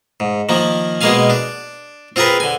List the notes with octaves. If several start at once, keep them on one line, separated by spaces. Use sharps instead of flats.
G#2
D#3 F3 A#3
B2 G#3 A#3 G#4 F5 G#5
D4
C4 F4 G#4 A#4 B4
D3 G#5